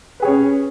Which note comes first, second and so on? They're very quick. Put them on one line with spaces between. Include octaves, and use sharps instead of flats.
B4 G#4 C#5 C#4